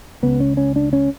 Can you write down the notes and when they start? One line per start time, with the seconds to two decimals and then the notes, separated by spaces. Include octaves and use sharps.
0.23 C#2 C#3 B3
0.40 C#4
0.57 C#4
0.76 D4
0.93 C#4